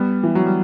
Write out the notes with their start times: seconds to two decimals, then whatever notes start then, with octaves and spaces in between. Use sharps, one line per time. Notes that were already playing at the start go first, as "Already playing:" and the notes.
Already playing: G3 B3
0.24 E3
0.35 F#3
0.46 G3